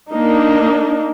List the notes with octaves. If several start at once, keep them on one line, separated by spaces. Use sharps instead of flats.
A#3 D4 D#4